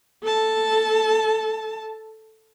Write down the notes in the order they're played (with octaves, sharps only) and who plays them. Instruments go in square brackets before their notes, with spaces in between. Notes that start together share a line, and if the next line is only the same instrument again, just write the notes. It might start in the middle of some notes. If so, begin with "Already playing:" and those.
[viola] A4 A5